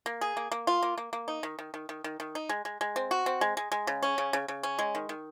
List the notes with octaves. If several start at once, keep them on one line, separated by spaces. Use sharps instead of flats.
A#3
G#4
A#3
A#3
F4
A#3
A#3
A#3
D#4
D#3
D#3
D#3
D#3
D#3
D#3
D#4
G#3
G#3
G#3
C4
F#4
C4
G#3
G#3
G#3
C#3
C#4
C#3
C#3
C#3
C#4
G#3
D#3
D#3